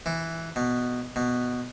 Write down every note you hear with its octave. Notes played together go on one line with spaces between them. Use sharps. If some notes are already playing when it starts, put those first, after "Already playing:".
E3
B2
B2